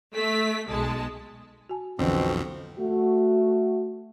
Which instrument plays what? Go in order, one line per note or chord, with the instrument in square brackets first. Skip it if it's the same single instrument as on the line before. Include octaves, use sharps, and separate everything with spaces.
[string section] A3 B6
B1 G#3 A5
[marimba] F#4 G#5 A5
[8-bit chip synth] B1 F2 [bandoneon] B2 C4 [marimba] D3 E3 C#4
[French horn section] A3 F#4